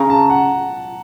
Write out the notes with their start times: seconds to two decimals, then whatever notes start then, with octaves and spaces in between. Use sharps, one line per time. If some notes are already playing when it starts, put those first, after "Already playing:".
Already playing: C#3 A#5
0.10 A5
0.30 F#5